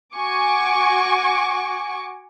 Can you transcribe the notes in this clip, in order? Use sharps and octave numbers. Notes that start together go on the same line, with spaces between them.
F#4 G#5 C#6 D6